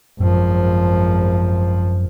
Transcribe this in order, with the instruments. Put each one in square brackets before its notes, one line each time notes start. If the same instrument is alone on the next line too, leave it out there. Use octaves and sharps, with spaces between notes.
[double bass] G#1 F3 [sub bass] F#2